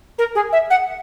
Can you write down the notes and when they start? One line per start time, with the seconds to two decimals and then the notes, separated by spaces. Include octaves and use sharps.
0.18 A#4
0.35 G#4
0.52 E5
0.70 F#5